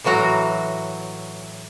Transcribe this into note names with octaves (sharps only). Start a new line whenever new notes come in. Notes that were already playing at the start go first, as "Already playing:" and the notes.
A2 E3 F#3 F#4 A#5